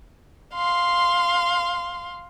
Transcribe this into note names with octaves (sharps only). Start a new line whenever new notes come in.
F5 C6